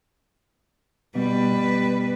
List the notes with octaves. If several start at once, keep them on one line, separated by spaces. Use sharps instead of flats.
B2 G3 B4